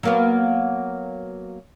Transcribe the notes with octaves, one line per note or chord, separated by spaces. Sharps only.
F#3 A#3 B3